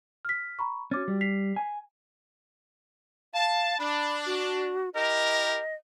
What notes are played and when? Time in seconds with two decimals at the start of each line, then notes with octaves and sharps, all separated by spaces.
0.25 F6 B6
0.59 A#5 B5 C#6
0.91 C#4 F#4 D6 A6
1.08 G3
1.21 B6 C7 F7
1.56 G#5
3.34 F5 A5
3.79 D4 B5
4.26 F#4
4.94 E4 G4 A#4 D#5